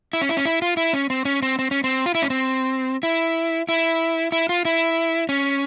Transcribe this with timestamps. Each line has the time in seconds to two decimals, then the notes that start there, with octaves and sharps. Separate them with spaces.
0.13 E4
0.21 C#4
0.29 E4
0.37 C#4
0.45 E4
0.62 F4
0.77 E4
0.93 C#4
1.10 C4
1.25 C#4
1.42 C4
1.59 C4
1.71 C#4
1.84 C4
2.06 F4
2.15 E4
2.22 C#4
2.30 C4
3.03 E4
3.69 E4
4.32 E4
4.49 F4
4.65 E4
5.29 C#4